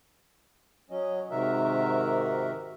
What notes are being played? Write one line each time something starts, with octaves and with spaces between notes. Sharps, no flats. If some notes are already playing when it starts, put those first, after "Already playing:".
F#3 C#4 D#5
G#2 C3 D#3 F#4 A#4 E5